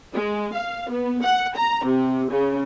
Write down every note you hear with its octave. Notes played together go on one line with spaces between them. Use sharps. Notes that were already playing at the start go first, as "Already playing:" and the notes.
G#3
F5
B3
F#5
A#5
C3
C#3